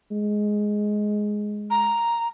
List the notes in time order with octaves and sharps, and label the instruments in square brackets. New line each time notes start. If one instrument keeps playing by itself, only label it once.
[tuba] G#3
[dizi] A#5